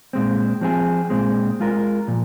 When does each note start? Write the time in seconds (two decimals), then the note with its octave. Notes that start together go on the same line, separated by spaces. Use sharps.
0.13 A#2 G#3 C4
0.61 F3 C4 G#4
1.10 A#2 G#3 C4
1.60 G#3 F4 A#4
2.08 A#2 F3